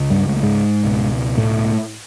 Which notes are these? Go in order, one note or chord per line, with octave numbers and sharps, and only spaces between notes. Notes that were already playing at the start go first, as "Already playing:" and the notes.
Already playing: C#2 C#3
G2 G3
G#3
A3
G#2 G#3
C#2 B2
A2 A3